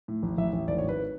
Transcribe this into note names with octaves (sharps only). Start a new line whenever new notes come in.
A2
A1
A1 E5
A1
G#1 D5
C#5
G#1
B4